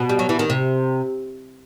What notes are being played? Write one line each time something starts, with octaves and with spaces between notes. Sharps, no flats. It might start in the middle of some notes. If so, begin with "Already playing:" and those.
Already playing: B2
G3
F#3
E3
D#3
C3